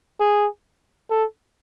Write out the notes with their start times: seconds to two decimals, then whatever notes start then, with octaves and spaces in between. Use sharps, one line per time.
0.20 G#4
1.10 A4